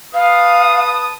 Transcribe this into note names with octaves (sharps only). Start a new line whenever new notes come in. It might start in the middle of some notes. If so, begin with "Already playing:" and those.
B4 F5 A5 D#6